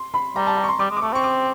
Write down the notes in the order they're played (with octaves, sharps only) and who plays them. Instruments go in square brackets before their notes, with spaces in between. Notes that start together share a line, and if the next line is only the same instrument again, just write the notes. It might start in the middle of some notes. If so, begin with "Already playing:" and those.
Already playing: [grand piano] C6
B5
[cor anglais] G3 [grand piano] A#5
[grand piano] A5
A#5
C#6
C6
[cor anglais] G3 [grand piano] D6
[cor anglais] G#3
[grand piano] D6
[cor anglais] A3 [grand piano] C#6
[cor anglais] C4 [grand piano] C#6
[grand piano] D6